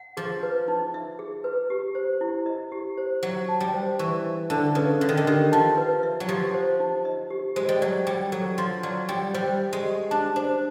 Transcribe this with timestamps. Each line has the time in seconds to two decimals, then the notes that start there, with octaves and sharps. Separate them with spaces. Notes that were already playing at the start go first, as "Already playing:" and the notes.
Already playing: F#5
0.17 F3 G#4
0.43 B4
0.68 D#4
0.94 E5
1.19 G#4
1.44 B4
1.70 G4
1.95 C5
2.21 E4
2.46 D#5
2.72 G4
2.97 C5
3.23 F#3 E5
3.48 A5
3.60 G3
3.74 C5
3.99 E3 C#6
4.24 E5
4.50 D3 A5
4.75 C#3 B4
5.01 D3 E5
5.09 D#3
5.17 D3
5.27 D#3 G4
5.52 F3 A5
5.77 B4
6.03 E5
6.20 F#3
6.28 F3 G4
6.54 C5
6.80 D#4
7.05 D#5
7.30 G4
7.56 G#3 C5
7.69 G3
7.82 F#3 D5
8.07 G3 G5
8.32 F#3 A4
8.58 F3 C6
8.83 F#3 D5
9.09 G3 G5
9.34 G3 C5
9.60 E5
9.73 G#3
9.85 G4
10.11 D4 A5
10.36 D4 C5